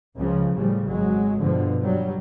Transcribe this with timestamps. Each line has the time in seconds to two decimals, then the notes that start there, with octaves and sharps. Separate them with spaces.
0.15 C#2 C#3 F3
0.55 A2 C#3 F3 G3
0.85 G#1 F#3 G#3
1.39 G2 B2 D3 F3
1.83 G2 F#3 G3